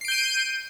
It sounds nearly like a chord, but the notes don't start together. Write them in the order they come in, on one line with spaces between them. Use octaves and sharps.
C7 D7 G6 D#7